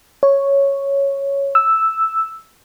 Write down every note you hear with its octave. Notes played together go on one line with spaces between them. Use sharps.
C#5
E6